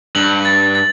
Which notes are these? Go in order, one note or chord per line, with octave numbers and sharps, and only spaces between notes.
G2 F#7
A6
A6